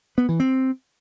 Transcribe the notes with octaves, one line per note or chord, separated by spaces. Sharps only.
B3
E3
C4